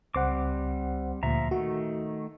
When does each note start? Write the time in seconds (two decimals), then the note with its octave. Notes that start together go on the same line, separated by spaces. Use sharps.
0.14 C#2 G3 C4 C5 F#5 D6
1.23 D2 A#2 F3 E5 A#5
1.51 D#3 A3 F#4